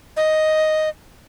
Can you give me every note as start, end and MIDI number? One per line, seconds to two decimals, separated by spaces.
0.17 0.89 75